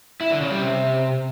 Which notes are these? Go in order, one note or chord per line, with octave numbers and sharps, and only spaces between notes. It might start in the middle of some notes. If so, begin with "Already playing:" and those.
E4
D3
C#3
G3
C3